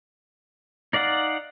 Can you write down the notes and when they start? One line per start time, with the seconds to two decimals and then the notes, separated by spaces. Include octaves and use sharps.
0.93 D#4 D5 F5 F#5